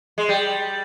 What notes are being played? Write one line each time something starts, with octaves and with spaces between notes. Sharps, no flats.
G#3
G3